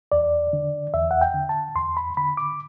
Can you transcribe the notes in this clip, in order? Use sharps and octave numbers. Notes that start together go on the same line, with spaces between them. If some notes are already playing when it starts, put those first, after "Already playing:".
E2 D5
D3
E2 E5
F#5
G5
D3
A5
E2 C6
B5
D3 B5
D6